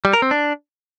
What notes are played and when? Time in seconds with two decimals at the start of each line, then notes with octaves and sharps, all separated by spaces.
0.05 G3
0.13 A#4
0.22 C4
0.31 D4